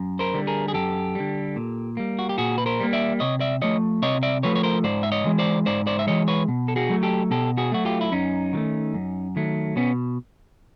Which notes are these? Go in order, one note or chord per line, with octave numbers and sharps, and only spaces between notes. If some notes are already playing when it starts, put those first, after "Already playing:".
Already playing: F#2
A#4 C5
D3 G3
G#4 A#4
G#4
F#2 G4 A4
D3 G3
A#2
G3 A#3
F#4
G4
A#2 F#4 G#4
B4
A#4 C5
G3 A#3
D5 E5
C3 C#5 D#5
D5 E5
F3 A3 C#5 D#5
C3 C#5 D#5
D5 E5
F3 A3 B4 C#5
C#5
A#4 C5
G#2 C5 D5
E5
C#5 D#5
E3 G#3
C5 D5
G#2 C5 D5
C5 D5
E5
E3 G#3 C#5 D#5
B4 C#5
B2
A4
F#4 G#4
F#3 A3
G4 A4
B2 G4 A4
F#4 G#4
F#3 A3 F#4
F4 G4
E4
F#2 C#4 D#4
D#3 F#3 A3
F#2
D#3 F#3 A3
B2 B3 C#4